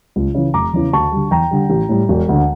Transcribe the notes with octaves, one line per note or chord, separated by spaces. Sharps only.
C#2
C#3 E3
F1 A#5 D6
E2 C#3 E3
D2 A5 C#6
D3 G3
E2 G5 A#5
D3 G3
A1
A2 G3
E1
D2 D3